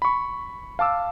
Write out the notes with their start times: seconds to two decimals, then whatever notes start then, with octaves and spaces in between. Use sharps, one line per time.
0.02 B5 C#6
0.79 F5 A5 D6 E6